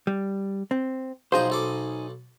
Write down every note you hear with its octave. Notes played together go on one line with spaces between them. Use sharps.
G3
C4
B1 F3 D#4 G#4 C5 G5
B1 A4 D6